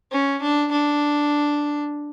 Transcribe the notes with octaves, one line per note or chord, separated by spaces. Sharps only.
C#4
D4
D4